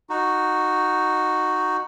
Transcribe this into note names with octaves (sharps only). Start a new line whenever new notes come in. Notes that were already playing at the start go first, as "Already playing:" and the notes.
D#4 F#4